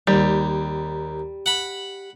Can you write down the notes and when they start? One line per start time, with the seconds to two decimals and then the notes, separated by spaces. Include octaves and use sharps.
0.07 D#2 G3
1.46 F#5 B5